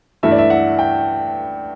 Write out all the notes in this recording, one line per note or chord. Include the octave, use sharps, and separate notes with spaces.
G2 E3 A3 E4 E5
D5
E5
F#5
G5